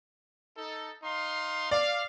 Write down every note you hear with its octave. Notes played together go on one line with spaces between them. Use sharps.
D#4 A4
D#4 F5 C6
D5 F5